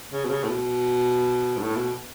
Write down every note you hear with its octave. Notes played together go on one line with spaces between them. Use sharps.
C#3
B2
C#3
A2
B2
G2
A2
B2